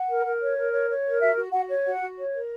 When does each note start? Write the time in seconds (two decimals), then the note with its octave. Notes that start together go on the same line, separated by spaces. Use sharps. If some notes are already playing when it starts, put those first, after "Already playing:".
Already playing: F#5
0.08 A#4
0.25 A#4
0.41 C#5
0.57 A#4
0.72 C#5
0.89 C#5
1.05 A#4
1.21 F#4 E5
1.37 F#4
1.52 F#4 F#5
1.69 C#5
1.84 F#4 F#5
2.01 F#4
2.17 C#5
2.33 A#4